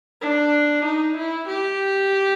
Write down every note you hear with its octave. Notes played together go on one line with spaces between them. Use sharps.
D4
D#4
E4
G4